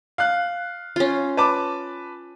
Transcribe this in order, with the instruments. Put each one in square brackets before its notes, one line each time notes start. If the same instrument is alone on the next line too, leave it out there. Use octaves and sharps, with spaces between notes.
[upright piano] F5 F#6
[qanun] C#4 F4
[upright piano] B4 A5 D6